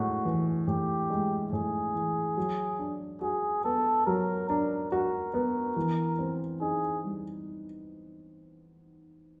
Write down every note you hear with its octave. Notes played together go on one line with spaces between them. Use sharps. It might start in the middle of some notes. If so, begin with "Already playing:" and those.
Already playing: A2 G#3 F#4
E3
A2 G4
G#3
A2 G#4
E3
F#3
D4
F#4 G#4
B3 A4
F#3 A#4
D4 A#4
F#4 A#4
B3
E3
C4
D#4 G#4
G3